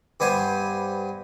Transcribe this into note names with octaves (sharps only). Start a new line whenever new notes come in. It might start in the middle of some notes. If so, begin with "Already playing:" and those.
G2 B3 C5 G#5